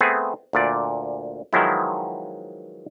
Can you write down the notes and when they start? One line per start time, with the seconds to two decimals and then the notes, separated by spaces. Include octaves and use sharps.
0.01 A3 B3 C4 G#4
0.53 D2 A#2 D5
1.53 D#3 F3 F#3 G#3 B3 E4